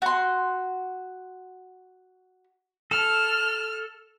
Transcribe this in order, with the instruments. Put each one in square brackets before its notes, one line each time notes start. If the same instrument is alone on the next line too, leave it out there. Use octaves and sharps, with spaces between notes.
[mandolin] F#4 C6
[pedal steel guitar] A4 [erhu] F6